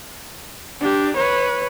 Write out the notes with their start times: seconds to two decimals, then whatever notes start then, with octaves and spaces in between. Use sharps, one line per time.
0.81 D4 G4
1.16 B4 C#5